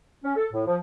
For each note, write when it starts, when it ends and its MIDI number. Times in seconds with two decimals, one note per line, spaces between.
0.24 0.36 61
0.36 0.46 69
0.53 0.66 45
0.67 0.77 53